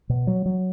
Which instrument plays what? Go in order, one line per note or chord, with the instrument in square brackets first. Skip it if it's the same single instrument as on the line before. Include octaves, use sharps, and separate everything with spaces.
[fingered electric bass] B2
F#3
F#3